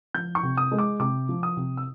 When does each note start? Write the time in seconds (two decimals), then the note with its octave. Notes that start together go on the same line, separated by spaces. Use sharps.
0.14 F3 G6
0.35 C#6
0.43 C3
0.57 D#6
0.72 G#3
0.78 D6
1.00 C3 D6
1.29 F3
1.43 D#6
1.57 C3
1.77 E6